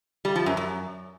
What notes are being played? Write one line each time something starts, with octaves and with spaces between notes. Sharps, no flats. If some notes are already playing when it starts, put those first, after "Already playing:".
G3
F3
F#2
F#2